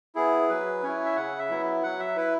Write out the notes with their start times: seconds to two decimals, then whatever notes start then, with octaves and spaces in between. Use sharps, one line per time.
0.15 B3 E4 G#4
0.49 F#3 B4
0.83 C#4 E4 C#5
1.05 E5
1.16 C#3 F#5
1.38 E5
1.49 F#3 B3 E4
1.83 F#3 F#5
1.99 E5
2.17 E4 B4